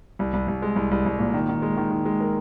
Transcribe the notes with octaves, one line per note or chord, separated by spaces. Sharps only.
C2
C2
C2
G#3
C2
C2
C2
A#2
D#3
D#3
G#3
D#3
D#3
G#3
A#4